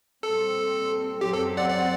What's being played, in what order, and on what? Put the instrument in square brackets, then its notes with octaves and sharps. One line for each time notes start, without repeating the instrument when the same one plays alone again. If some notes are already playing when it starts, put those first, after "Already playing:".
[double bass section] A#2 G3 C4 [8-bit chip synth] A4
[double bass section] F#2 F#3 C4 [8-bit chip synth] G4
[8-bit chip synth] A4
D5 F#5
D5 F#5